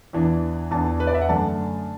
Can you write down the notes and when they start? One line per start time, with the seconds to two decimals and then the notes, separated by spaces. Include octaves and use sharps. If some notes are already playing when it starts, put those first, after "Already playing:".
0.13 E2 E3 D4
0.71 E2 E3 D4 A5
1.00 B4
1.07 D5
1.14 E5
1.21 F#5
1.29 F#2 D3 A3 D4 A5